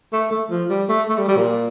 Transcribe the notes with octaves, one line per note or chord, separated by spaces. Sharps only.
A3
A3
F3
G3
A3
A3
G3
G3
A#2